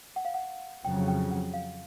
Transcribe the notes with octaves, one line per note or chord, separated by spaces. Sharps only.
F#5
F5
F#5
F2 C#3 F#3 G5
G5
F#5
F5